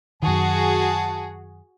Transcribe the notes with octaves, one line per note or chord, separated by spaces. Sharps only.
F#2 D#3 F#4 G#4 A5